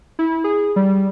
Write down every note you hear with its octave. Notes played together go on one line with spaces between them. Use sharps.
E4
G#4
G3